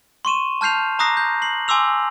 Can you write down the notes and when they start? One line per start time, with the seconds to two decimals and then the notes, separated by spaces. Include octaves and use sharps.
0.25 C6 C#6 D#7 E7
0.61 A5 F6 G6 C7 F7
0.99 A#5 D6 D#6 F#6 A#6 C7
1.17 G6
1.42 C7 F#7
1.68 G#5 C6 D6 E6 F7